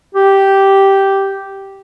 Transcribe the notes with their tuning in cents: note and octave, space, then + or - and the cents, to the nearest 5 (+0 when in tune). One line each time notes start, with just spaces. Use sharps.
G4 -5